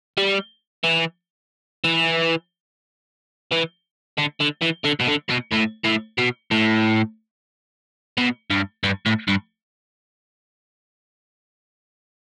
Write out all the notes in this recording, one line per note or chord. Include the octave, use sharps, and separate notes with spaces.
G3
E3
E3
E3
D3
D3
E3
D3
B2
D3
B2
A2
A2
B2
A2
B2
G2
G2
A2
G2